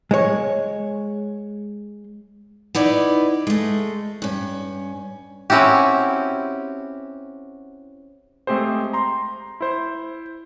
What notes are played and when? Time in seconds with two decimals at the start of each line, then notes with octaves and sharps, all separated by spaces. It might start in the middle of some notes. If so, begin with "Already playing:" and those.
0.11 G#3 C#5
2.75 B3 D#4 E4 D5
3.47 G#3 A3
4.22 G2 C#4
5.50 C4 C#4 E4 F#4 G4
8.47 G#3 A3 C4 G4 G#4 C5
8.93 A#5 C6
9.61 E4 C5